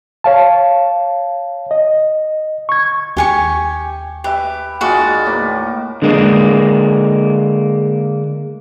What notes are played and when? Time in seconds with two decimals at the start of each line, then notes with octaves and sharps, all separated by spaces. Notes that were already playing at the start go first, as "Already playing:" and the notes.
0.24 C#5 F5 A5
1.71 D#5
2.69 C#6 G#6
3.17 D#2 G4 G#5 C#6
4.24 G4 B4 E5
4.81 D#3 G#3 F4 F#4 D5 D#5
5.26 A2 A#3 B4
6.02 D3 G#3 A#3